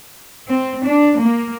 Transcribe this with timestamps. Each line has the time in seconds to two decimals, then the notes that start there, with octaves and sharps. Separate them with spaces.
0.49 C4
0.85 D4
1.19 A#3